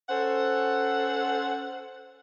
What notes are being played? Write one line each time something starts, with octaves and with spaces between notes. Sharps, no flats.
C#4 A4 C5 F#5